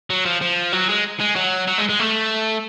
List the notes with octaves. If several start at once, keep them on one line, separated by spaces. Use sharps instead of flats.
F#3
F3
F3
F#3
G#3
G#3
F#3
F#3
G#3
G#3
A3